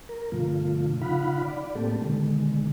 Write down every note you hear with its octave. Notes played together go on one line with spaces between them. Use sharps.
A#4
G2 B2 D3 F3 A3 F4
C#3 D#4 F4 F5 F#5 B5
D5
A2 A3 A#3 C4 G4 A4
B2 D3 D#3 G#3